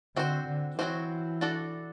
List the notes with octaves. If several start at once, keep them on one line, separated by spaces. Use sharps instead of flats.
D3 C4 F#4 C5
D3
E3 F#3 A3 C4 F#4 C5
D4 F#4 A4 D5